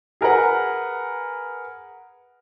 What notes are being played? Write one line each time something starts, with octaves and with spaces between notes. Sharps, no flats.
G#4 A#4 B4 F#5